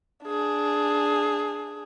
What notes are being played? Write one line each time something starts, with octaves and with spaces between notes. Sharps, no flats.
D4 G#4